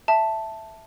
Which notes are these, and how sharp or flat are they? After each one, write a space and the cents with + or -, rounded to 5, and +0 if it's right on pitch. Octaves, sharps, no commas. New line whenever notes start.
E5 +0 A5 +0